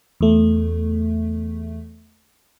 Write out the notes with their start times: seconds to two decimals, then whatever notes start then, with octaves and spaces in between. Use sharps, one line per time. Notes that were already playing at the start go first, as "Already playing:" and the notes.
0.21 E2 A3